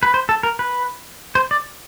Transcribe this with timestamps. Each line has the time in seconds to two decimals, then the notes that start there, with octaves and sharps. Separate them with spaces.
0.03 B4
0.14 C5
0.29 A4
0.43 A#4
0.59 B4
1.35 C5
1.51 D5